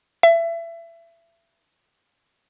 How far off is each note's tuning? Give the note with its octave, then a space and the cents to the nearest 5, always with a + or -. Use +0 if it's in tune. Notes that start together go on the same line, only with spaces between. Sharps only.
E5 +25